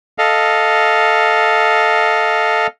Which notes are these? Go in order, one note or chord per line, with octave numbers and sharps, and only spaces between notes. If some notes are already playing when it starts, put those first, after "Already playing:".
A4 D#5 F5